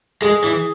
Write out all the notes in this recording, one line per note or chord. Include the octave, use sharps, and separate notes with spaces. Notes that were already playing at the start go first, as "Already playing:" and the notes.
G#3 G#4
E3